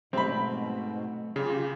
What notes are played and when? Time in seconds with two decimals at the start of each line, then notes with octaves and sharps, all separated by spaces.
0.13 G#2 B2 F#3 A3 C4 B5
1.36 C#3 F4 G4 G#4